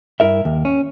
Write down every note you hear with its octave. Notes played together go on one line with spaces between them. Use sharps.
G2 E4 A#4 E5
D#2
C#4